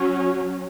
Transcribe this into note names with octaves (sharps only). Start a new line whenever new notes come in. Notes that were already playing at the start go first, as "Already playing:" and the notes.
Already playing: F#3 C#4